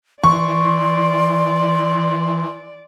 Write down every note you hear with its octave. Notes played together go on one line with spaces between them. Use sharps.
E3 D5 C6 C#6